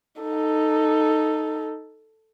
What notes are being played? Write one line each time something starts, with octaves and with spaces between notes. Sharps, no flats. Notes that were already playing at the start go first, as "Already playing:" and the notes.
D#4 A4